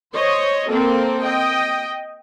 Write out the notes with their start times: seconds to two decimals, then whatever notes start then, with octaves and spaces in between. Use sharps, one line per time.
0.13 C5 C#5 D#5
0.68 A#3 C4 A4 A#4
1.22 D#5 G5